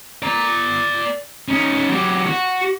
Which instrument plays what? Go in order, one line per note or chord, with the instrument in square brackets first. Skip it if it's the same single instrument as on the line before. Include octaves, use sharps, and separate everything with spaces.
[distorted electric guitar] D5 A#5
C#4 D#4
F#3 G4
F#4